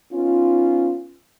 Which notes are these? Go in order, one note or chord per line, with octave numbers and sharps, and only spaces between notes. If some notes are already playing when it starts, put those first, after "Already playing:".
B3 C#4 D#4 F4